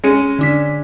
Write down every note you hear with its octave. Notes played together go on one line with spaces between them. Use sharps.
G#3 C#4 C#7 D#7
D3 D4 B6